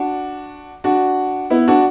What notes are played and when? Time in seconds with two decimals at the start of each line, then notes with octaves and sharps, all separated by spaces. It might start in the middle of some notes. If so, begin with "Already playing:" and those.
Already playing: D4 F#4
0.84 D4 F#4
1.50 B3 E4
1.68 D4 F#4